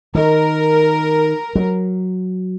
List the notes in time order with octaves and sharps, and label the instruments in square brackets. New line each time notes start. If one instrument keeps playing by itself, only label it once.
[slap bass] D#3 [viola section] A#4
[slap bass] F#3